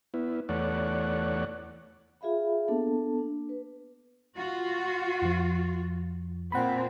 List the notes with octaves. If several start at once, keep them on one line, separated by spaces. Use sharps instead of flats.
B3 E4
E2 A3 C#5 D5 F#5
F4 G#4 E5 F5 B5
A#3 B3 D4 A4 A5
D4
B4
F4 F#4
F2 F3
A#2 C4 F#5 B5